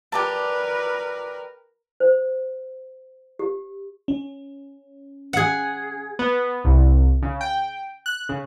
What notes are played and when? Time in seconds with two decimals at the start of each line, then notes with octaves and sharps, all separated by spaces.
0.12 G4 A#4 B4 D5 A5
2.00 C5
3.39 G4
4.08 C#4
5.33 G#4 F#5
6.19 B3
6.64 C2
7.23 C#3
7.41 G5
8.06 F#6
8.29 C#3